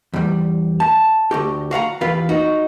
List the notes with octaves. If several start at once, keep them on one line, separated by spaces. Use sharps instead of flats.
E2 G3
A5
D2 F#4 G4
F#4 F5 F#5 A#5
E2 F4 G4 B4 F5
D#4 F#4